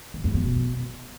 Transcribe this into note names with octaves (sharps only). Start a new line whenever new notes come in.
G#2
F#2
B2